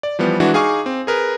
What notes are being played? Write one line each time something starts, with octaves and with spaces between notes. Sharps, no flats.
D5
E3 F3 G3 B3
E3 G#3 D4 E4 F#4
D#4 G#4 F5 G#5 C#6 D6
C4
G#4 A#4 B4